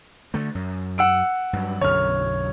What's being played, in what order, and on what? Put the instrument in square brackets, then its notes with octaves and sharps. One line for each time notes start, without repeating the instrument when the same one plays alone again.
[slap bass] D3 A3
F#2
[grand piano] F#5 E6 D7
[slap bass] G2 F#3
[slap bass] B1 F#2 D3 [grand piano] C#5 F6